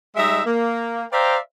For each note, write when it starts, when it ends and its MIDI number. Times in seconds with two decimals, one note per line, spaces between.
0.16 0.42 55
0.16 0.42 56
0.16 0.42 63
0.16 0.42 76
0.46 1.05 58
1.12 1.38 72
1.12 1.38 74
1.12 1.38 76
1.12 1.38 77
1.12 1.38 79
1.12 1.38 82